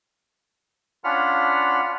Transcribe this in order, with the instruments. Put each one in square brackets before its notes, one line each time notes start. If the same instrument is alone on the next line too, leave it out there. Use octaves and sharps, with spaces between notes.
[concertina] C#4 D4 F4 F#5 B5 F6